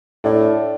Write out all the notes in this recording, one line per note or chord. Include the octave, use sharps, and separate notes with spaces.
A2 D4